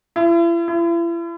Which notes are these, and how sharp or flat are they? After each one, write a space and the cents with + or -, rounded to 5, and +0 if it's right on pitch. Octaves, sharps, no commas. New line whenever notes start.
E4 +40
E4 +40